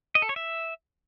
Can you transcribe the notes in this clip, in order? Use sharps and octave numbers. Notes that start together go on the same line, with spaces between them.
D#5
A4
C#5
E5